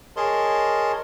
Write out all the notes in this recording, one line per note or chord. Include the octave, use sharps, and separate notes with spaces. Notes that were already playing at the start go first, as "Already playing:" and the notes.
G#4 A#4 C#5 D#5 A5 C6